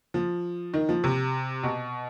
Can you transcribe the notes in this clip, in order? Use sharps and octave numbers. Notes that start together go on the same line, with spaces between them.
F3
D#3
F3
C3
B2